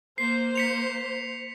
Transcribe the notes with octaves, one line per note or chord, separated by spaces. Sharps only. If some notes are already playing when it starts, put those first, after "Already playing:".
A#3 C5 C7
B6 C#7 F7